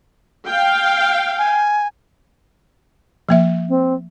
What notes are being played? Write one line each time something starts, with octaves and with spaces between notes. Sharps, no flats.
F5 G5
G#5
F3 A#3 E5
C4